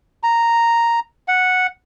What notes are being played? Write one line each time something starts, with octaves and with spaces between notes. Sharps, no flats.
A#5
F#5